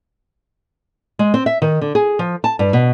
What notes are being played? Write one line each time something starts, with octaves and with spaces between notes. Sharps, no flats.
G#3
C4
E5
D#3
D3
G#4
F3
A5
G2
B2